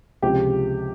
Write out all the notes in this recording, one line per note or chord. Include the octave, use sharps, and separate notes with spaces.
C#2 C3 F3 G4